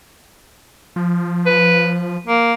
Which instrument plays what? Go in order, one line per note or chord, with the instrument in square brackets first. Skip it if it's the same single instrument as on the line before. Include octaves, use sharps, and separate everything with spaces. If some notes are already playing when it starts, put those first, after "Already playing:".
[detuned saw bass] F3
[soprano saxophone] B4
A#3